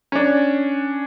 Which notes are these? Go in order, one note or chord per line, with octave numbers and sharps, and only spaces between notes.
C#4 D4